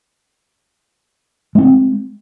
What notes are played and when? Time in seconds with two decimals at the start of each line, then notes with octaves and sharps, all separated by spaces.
1.55 G#3
1.58 C#4
1.61 C4